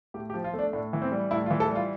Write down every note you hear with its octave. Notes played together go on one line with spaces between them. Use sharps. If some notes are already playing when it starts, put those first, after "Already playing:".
A2 G4
G4
F3
F4
A3
D4
A2 D4
E3
C4
G3
A2 E4
F4
E3
A4
G3
F4